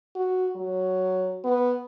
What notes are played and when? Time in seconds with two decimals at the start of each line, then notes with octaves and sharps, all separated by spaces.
0.15 F#4
0.56 F#3
1.44 B3